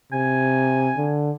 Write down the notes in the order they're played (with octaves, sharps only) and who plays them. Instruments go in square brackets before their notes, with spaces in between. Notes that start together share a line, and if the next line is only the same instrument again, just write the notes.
[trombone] C3 [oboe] G#5
[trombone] D3